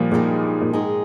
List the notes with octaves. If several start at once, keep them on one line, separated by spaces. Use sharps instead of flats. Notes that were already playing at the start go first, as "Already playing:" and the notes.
Already playing: A#2 F3 G3
A#2 D#3 G#3 D#4 G#4
A#2
G#2 D#3 G#3 D#4 G#4